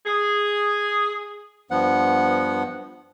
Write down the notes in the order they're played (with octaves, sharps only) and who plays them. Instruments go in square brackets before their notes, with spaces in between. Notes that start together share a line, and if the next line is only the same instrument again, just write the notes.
[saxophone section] G#4
[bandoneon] G2 F3 B3 F#5